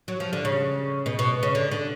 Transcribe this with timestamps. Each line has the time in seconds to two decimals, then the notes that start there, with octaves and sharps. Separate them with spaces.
0.08 F#3
0.20 F3
0.33 D3
0.45 C#3
1.06 B2
1.19 B2
1.43 C#3
1.55 D3
1.72 D3